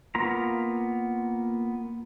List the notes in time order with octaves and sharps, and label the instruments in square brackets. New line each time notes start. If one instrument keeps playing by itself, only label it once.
[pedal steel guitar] A#3 B3 F4 A#5